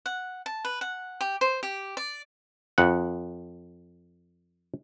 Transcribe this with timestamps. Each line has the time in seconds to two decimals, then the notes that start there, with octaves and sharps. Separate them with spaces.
0.06 F#5
0.46 A5
0.65 B4
0.81 F#5
1.21 G4
1.41 C5
1.63 G4
1.97 D5
2.78 F2 F#5